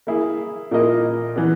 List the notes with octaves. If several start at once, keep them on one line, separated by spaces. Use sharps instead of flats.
A#3 E4 G#4
A#2 A#3 E4 A#4 D#5
E3 B3